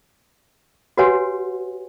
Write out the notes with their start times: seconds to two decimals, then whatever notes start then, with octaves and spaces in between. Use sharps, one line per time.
0.97 F#4 G4 B4 C#5 F#5 G#5